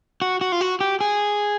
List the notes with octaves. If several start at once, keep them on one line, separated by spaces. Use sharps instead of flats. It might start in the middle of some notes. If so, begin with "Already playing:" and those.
F#4
F#4
F4
F#4
G4
G#4